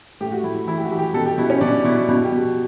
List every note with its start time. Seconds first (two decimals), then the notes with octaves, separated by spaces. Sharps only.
0.21 A2 G4
0.32 F#4
0.44 A2 E4
0.67 E3 E4
0.77 G4
0.83 F#4
0.91 E3
0.98 G4
1.14 B2 A4
1.26 G4
1.38 B2 E4
1.50 C#4
1.61 B2 D4
1.84 B2 E4
2.08 B2 E4
2.24 G4
2.32 B2